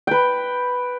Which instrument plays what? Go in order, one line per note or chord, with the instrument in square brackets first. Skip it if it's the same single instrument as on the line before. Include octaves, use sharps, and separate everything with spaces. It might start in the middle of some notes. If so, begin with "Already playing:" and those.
[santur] B4 G5